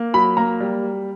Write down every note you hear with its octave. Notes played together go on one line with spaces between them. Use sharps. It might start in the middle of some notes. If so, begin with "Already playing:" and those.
Already playing: A#3
F#3 B5
A#3 A#5
G3